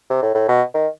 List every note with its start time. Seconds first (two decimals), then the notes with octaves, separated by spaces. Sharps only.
0.10 C3
0.23 A2
0.35 A2
0.49 B2
0.74 D#3